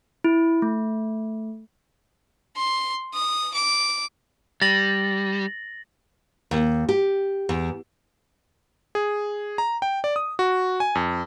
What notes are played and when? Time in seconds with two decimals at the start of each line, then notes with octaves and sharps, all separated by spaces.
0.24 E4
0.62 A3
2.57 C6
3.14 D#6
3.54 D6
4.62 G3 A6 A#6 F#7
6.51 D#2
6.89 G4
7.49 E2
8.95 G#4
9.58 A#5
9.82 G5
10.04 D5
10.16 D#6
10.39 F#4
10.80 G#5
10.95 F2